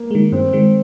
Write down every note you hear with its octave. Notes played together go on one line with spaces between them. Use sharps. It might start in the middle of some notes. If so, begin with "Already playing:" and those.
Already playing: A#3
D#3 G#3
G2 C4
D#3 G#3